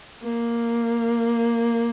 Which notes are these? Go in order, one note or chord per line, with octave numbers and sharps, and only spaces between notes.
A#3